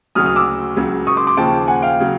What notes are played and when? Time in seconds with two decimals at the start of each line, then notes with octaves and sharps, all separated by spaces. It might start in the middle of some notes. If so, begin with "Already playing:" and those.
0.15 D2 C#3 F#3 D#6 F6
0.26 D#6 F6
0.36 D6 E6
0.76 C#2 C#3 F#3
1.07 C#6 D#6
1.17 C6 D6
1.27 C6 D6
1.37 D#2 C#3 F3 G5 A5
1.68 F#5 G#5
1.82 F5 G5
2.00 C#3 F#3